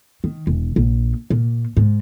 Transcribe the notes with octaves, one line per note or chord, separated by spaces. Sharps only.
D#3
E1
A#1
A#2
G#2